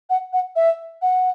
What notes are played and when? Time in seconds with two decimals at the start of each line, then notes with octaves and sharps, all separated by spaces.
0.10 F#5
0.33 F#5
0.56 E5
1.02 F#5